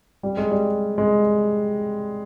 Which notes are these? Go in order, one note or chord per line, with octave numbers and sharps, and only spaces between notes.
G3
G#3
G3
G#3